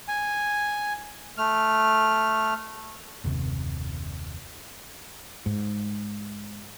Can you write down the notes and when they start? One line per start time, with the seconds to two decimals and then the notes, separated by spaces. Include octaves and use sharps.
0.08 G#5
1.38 A3 F6
3.24 F#1 D#2 C3
5.46 G#2